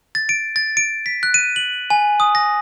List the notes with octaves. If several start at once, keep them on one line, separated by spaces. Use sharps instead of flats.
A6
D7
A6
D7
B6
F#6
D#7
F#7
G#5
D#6
A#6